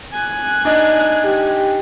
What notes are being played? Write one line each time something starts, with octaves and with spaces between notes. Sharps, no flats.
G#5 F#6
D4 D#4
G4